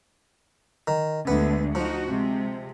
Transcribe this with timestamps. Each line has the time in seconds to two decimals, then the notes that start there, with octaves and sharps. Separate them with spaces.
0.88 D#3
1.27 D2 D3 G#3 B3
1.75 F3 D#4 F#4
2.06 C3 G#3